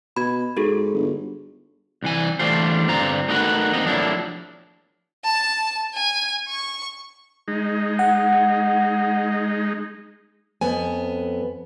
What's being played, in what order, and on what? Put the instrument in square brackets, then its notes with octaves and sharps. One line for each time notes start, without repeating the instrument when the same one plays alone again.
[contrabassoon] B2 [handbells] B5 G#6
[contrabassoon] G#2 [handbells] F#4 G#4 A4
[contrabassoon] G1
[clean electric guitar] C2 E3 G#5
E3 G3 A3 D4 F4 C5
G2 D3 C4 F4 A#5
A3 D#4 F#4 A#4 B4
A#3 C4 D#5
F3 F#3 A3 A#3 D4 E4
[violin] A5
G#5
C#6
[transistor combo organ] G#3 D#4
[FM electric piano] F#5
[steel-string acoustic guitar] F2 B3 G#5